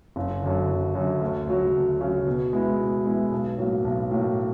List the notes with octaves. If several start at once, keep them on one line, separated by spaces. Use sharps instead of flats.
F#1
F#2 D3
F#1
F#2 D3
D2
C#3 F#3
D2
C#3 F#3
B2
G#3 B3 E4
B2
G#3 B3 E4
B1
A2 F#3 A#3
B1
A2 F#3 A#3